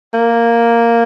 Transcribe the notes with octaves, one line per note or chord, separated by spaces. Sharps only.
A#3